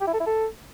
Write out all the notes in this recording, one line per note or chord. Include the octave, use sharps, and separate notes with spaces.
G4
E4
A4
E4
A4